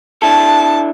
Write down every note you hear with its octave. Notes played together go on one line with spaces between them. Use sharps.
D4 E4 A4 A5